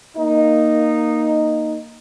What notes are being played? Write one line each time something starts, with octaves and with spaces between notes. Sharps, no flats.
A#3 D#4